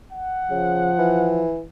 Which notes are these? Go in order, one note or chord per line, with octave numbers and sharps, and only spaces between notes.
F#5
C#3 F3
E3